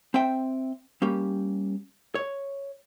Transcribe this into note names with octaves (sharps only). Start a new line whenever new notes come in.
C4 C5 E5 G5
G3 A#3 C#4 G4
C#5